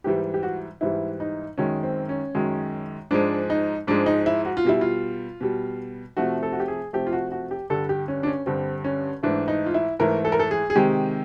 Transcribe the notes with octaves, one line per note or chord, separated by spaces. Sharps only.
G#2 E3 G3 G4
G4
F#4
G#2 E3 G3 E4
D#4
F#2 D#3 G#3 C#4
C4
C#4
F#2 D#3 G#3
G#2 F3 G#3 D4
D#4
G#2 F3 G#3 D4
D#4
E4
F#4
F4
B2 G3 E4
F4
B2 G3
C3 F3 A3 F#4
A4
F#4
G4
G#4
C3 F3 A3 G4
F4
F#4
F#4
G4
G2 D3 G3 A4
G4
C#4
D4
C#4
G2 D3 G3 C4
C#4
G#2 E3 A3 D4
D#4
F4
E4
G#2 E3 A3 A#4
A4
A#4
A4
G#4
G#4
C3 D#3 G#3 G4